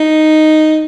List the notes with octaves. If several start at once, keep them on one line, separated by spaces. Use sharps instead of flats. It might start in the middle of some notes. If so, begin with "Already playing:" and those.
Already playing: D#4